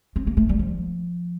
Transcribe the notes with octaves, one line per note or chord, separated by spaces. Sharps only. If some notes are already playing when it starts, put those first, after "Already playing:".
C4
A#3
A3
G3
F3